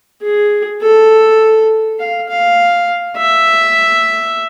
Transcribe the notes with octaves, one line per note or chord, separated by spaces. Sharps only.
G#4
A4
F5
F5
E5